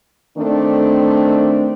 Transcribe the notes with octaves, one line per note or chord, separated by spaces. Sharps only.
D#3 A3 C4 D4